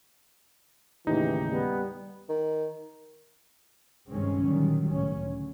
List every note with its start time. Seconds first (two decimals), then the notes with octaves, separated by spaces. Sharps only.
1.07 D#2 A2 C#3 E3 D#4 G4
1.51 G3 B3
2.29 D#3
4.09 G2 C3 D#3 G#3 C4 C#4
4.43 A#2 D3 D#3 F#3 G3
4.90 C#2 A2 C#4
5.23 D3